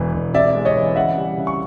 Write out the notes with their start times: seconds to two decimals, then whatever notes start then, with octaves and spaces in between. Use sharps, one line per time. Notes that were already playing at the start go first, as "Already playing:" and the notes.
Already playing: E1 E3
0.14 E1
0.34 C3 D5 E5
0.55 G#3
0.65 C#5 D#5
0.76 E3
0.96 C#3 E5 F#5
1.17 G3
1.37 C#3
1.47 C#6